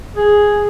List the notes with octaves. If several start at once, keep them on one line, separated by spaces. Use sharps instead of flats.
G#4